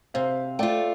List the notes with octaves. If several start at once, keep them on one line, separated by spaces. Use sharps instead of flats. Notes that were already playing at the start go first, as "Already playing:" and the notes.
C3 C5 F5
A3 F4 D5 G5